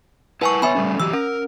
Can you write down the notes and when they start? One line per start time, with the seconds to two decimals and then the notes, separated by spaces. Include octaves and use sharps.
0.41 E4 B4 F#5 G#5 A5 C#6
0.62 B3 C#5 E5 G#5 B5
0.75 G3 A3 C#4
1.00 E3 F#3 G4 E6
1.14 C#4 A#4